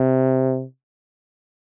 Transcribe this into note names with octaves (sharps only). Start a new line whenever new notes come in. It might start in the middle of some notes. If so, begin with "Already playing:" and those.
Already playing: C3